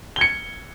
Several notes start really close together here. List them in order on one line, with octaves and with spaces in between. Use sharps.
G7 G#6 C#7